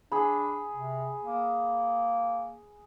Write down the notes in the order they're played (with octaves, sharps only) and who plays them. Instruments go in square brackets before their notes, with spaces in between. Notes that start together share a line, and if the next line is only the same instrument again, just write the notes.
[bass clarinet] D4 [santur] G#4 B5
[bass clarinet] C3
A#3